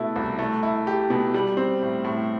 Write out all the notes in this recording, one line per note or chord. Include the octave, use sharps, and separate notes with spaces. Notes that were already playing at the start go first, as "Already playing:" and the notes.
Already playing: B2 A3 E4
C2
A3
E4
G4
B2
G3
C4
A2
A2